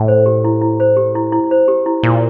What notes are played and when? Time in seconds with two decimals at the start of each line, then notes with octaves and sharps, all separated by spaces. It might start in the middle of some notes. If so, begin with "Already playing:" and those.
Already playing: A2
0.08 C5
0.26 G4
0.44 E4
0.61 E4
0.80 C5
0.97 G4
1.15 E4
1.32 E4
1.51 C5
1.68 G4
1.86 E4
2.03 A#2 E4